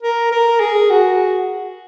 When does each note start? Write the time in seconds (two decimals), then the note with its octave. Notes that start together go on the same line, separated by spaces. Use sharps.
0.03 A#4
0.32 A#4
0.60 G#4
0.90 F#4